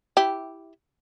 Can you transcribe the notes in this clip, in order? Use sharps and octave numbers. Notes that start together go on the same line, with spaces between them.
E4 G4